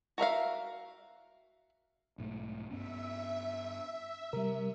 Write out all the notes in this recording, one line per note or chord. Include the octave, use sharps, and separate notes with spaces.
F#4 A#4 E5 F5
B1 G#2 A3
G2 B3 C#4 E5
C3 G3 A#4